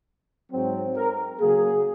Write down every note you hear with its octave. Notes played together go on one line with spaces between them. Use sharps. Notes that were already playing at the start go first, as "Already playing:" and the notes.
G#2 F#3 C4
A#4
C#3 F#3 A#3 G#4